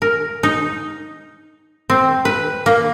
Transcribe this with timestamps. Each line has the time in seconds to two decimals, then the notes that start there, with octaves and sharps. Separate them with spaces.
0.02 A#4
0.43 D#4
1.90 C4
2.25 B4
2.66 A#3